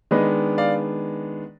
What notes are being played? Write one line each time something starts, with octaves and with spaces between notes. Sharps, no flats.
D#3 G#3 B3 D4 B4 D#5
D5 F5